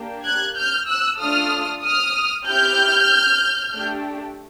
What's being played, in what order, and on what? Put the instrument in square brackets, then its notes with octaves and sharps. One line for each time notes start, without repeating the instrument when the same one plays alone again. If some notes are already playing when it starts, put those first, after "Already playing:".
Already playing: [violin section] A#3 D4 G4
F#6 G#6
F6 G6
E6 F#6
A3 D4 F4 A4 D#6 F6
D#6 F6
C4 E4 G4 F6 G6
A3 D4 G4